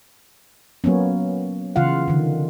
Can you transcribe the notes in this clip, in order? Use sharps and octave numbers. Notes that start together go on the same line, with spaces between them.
F#3 A#3 B3 C#4
C#3 E3 F4 F5 F#5
D3 D#3